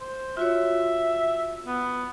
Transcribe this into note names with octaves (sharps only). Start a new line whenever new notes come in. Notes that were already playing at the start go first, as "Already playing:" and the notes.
C5
F4 F#4 C#5 E5
B3